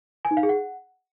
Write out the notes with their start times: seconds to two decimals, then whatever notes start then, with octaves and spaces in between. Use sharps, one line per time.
0.25 G#5
0.31 D#4
0.37 F5
0.43 G#4
0.49 F#5